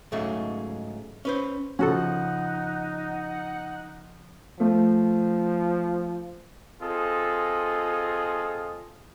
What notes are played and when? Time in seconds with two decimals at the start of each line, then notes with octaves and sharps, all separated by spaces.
0.12 G#2 C#3 F#3 G#3 A3
1.25 C#4 B4 C5
1.79 C#3 F3 C#4 D#4 F#4 A4 F#5
4.60 F3 A3
6.81 C4 F4 G#4 A4 D#5